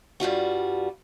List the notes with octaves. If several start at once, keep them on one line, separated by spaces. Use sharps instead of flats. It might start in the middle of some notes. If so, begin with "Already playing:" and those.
G2 G3 F4 F#4